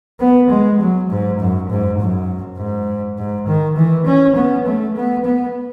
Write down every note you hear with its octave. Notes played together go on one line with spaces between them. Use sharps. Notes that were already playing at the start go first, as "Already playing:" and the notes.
B3
G#3
F#3
G#2
F#2
G#2
F#2
G#2
G#2
D#3
E3
C#4
B3
A3
B3
B3